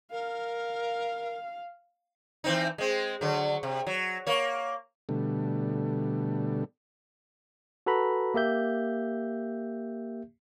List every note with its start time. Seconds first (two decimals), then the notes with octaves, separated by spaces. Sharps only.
0.12 A#4 F5
2.44 E3 C4 D#4
2.78 G#3 C4
3.21 D3 F#3
3.63 C3
3.87 F#3
4.27 A#3 C#5
5.09 B2 D3 G3 A3
7.86 F#4 A4 B4 A#5 B5
8.34 A#3 G4 E5 G6